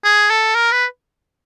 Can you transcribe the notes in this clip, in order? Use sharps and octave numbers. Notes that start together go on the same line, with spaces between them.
G#4
A4
A#4
B4